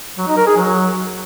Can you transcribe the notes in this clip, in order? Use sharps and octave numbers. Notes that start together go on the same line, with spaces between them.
F#3
D#4
A#4
G#4
F#3